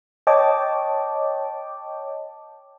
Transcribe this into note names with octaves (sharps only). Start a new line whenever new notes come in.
C#5 D#5 G5 A5 D6